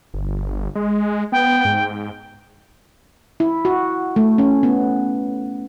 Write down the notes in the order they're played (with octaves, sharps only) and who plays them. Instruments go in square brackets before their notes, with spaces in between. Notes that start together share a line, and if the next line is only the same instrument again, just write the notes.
[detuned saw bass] G1
G#3
[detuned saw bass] B3 [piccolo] G5
[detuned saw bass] G#2
[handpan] E4
F#4
A3
C#4
B3